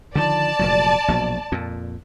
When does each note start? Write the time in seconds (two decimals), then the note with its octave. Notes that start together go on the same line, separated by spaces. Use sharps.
0.15 D3 D#3 F3 D5 A5
0.59 F1 A#2 F#3
1.08 A#1 B2 F#3
1.52 F2 A#2